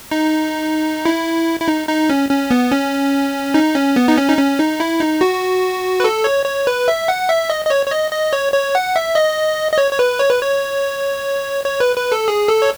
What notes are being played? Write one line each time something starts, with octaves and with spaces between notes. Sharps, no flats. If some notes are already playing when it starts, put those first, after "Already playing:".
D#4
E4
E4
D#4
D#4
C#4
C#4
B3
C#4
D#4
C#4
B3
D#4
C#4
D#4
C#4
D#4
E4
D#4
F#4
B4
A4
C#5
C#5
B4
E5
F#5
E5
D#5
D#5
C#5
C#5
D#5
D#5
C#5
C#5
F#5
E5
D#5
D#5
C#5
C#5
B4
C#5
B4
C#5
C#5
B4
B4
A4
G#4
A4
C#5